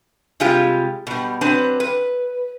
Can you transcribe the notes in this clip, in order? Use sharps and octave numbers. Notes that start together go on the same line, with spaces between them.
C3 G3 G#3 F4 G4
B2 G3
F#3 C4 D4 B4 A5
B4